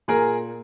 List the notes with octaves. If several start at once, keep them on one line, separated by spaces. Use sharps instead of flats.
A#2 G#4 A#4